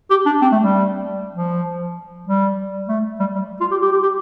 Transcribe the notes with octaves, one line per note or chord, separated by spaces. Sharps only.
G4
D4
C4
A3
G3
F3
G3
A3
G3
G3
F4
G4
G4
G4
G4